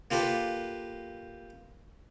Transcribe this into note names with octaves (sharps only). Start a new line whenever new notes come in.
A#3 F4 G4 A4 B4